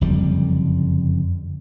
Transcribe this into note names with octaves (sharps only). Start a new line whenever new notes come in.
F#1 F2 D3 G3